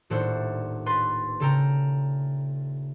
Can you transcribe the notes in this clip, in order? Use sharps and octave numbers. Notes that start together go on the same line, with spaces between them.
D#1 A2 D4 A4 C5 F#5
B4 C6 A6
C#3 A4 G5 A#5